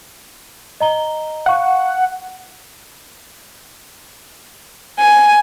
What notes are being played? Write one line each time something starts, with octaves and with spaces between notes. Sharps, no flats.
D#5 A#5 G7
F5 F#5 C#6
G#5